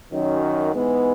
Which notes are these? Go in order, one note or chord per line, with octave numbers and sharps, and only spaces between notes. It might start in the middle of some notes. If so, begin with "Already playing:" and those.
F#2 D#3 F#3
G#2 E3 G#3 B3